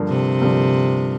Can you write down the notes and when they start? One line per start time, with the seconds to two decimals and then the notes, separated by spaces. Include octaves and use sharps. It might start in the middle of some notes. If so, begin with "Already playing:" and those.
Already playing: G2 D3 F3 A#3
0.09 C3
0.42 G2 D3 F3 A#3